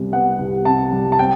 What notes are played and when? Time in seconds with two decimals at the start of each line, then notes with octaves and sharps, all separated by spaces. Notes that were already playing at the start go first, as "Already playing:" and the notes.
Already playing: C2 C3 G3 B3
0.12 B3 F#5
0.39 C2
0.65 C3 A5
0.92 G3
1.12 A5
1.19 C4 G5